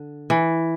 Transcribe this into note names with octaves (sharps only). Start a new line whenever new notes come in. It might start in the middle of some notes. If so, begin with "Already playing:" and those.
Already playing: D3
E3